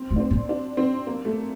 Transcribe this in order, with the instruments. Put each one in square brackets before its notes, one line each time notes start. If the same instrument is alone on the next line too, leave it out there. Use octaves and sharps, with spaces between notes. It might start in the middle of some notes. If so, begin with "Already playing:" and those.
Already playing: [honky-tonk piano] C4
[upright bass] A3
[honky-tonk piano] D4
C4
[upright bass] A#3
[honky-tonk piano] D4
C4
A#3
A3